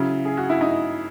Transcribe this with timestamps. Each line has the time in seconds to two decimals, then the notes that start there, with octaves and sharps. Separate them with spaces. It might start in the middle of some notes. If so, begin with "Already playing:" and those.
Already playing: C#3 F#3 E4
0.25 G#4
0.37 F#4
0.50 E4
0.61 D#4